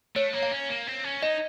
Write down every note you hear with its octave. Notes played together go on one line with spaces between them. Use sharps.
A3 C#5
A#3
F5
C#4
A#3
C4
C#4
D#4 D#5